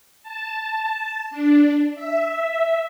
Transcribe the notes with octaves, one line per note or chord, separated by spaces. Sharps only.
A5
D4
E5